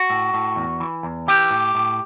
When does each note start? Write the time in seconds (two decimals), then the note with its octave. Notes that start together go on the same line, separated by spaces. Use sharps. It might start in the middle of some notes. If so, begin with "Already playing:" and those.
Already playing: F#4
0.10 A2
0.34 A2
0.56 E2
0.80 E3
1.03 E2
1.28 E3 G4
1.51 A2
1.75 A2